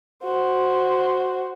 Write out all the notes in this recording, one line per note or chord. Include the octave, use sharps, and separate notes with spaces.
F#4 C5